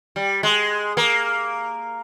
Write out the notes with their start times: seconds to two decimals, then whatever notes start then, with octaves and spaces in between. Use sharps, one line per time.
0.16 G3
0.43 G#3
0.97 A#3